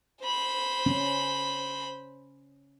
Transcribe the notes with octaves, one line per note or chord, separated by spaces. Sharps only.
C5 B5
C#4